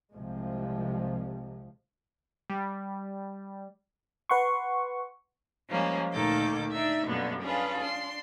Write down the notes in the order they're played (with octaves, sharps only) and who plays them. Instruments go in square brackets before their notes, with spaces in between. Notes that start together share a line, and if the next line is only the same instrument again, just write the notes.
[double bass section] C2 F3 [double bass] C3 G#3
[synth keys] G3
[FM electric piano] B4 F#5 C6 C#6
[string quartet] F3 G3 G#3 A#3 C#4
D2 A#2 D#3 A4 D6 G6
D4 D#4 D5 E5
F#2 B2 D3 G3 A#3 B3
C#4 D4 F4 G#4 A4 B4
D4 C6